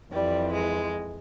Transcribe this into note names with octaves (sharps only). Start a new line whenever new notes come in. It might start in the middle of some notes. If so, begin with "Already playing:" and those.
F2 E3 G3
G#3